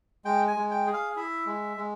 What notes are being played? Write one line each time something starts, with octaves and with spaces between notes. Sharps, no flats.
G#3 G5
G#5
G#3
G5
G#4
F5
E4 E5
G#3
G#3